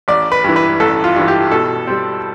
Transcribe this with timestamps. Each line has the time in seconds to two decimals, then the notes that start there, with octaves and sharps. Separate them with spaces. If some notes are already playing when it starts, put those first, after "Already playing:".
0.08 A1 D5
0.32 B4
0.44 G2 E3
0.56 B4
0.80 A1 A4
1.04 F4
1.16 G2 E3
1.28 G4
1.52 B2 A4
1.87 G3 C4